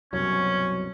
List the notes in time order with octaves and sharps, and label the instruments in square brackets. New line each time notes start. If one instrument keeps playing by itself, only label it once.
[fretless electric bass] C2 F#2 B2 [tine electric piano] F#3 C#5 [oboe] C#4